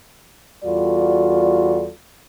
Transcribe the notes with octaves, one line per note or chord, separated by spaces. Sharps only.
E2 G3 F4 F#4 A4 D5